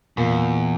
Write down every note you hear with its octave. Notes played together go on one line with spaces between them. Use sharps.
E2 A#2